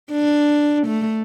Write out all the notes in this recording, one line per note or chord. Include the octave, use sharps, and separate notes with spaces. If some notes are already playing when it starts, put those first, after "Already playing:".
D4
A3